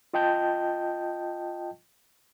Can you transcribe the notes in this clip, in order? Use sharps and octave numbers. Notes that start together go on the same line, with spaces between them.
F4 D#5 G5 A5 G6